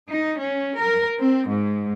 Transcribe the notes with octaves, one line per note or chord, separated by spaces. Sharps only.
D#4
C#4
A#4
C4
G#2